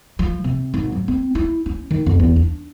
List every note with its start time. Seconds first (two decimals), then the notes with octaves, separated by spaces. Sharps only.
0.19 F3
0.44 C3
0.74 G#1
0.92 F#3
1.08 C4
1.35 E4
1.66 C#4
1.91 D#3
2.06 F2
2.19 E2
2.36 D4